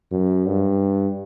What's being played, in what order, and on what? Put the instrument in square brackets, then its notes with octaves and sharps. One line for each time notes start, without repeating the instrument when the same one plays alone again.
[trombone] F#2
G2